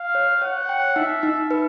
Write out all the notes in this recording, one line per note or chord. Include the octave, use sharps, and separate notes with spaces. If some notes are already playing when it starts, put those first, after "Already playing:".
Already playing: F5
C#5
C#5 F#5
G5
D#4 E5
D#4
B4